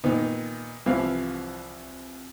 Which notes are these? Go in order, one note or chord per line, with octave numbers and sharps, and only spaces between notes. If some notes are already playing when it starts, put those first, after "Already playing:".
A#2 D#3 B3 D#4
C2 E3 F3 F5